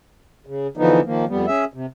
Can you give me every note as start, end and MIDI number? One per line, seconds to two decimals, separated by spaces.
0.46 0.67 49
0.77 1.00 40
0.77 1.00 50
0.77 1.00 52
0.77 1.00 53
0.77 1.00 59
0.77 1.00 63
1.05 1.25 51
1.05 1.25 53
1.05 1.25 58
1.29 1.46 41
1.29 1.46 55
1.29 1.46 59
1.47 1.64 61
1.47 1.64 68
1.47 1.64 76
1.74 1.86 48